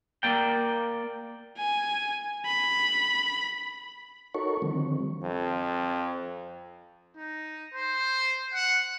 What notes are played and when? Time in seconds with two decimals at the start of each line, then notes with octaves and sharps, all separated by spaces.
0.23 A#3 D5 G5
1.58 G#5
2.46 B5
4.34 D#4 F#4 A4 A#4 C#5 C#6
4.62 D3 D#3 F3 G3 C4
5.23 F2
7.17 D#4
7.74 C5
8.54 F#5